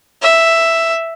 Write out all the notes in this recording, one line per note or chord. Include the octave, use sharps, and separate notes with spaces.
E5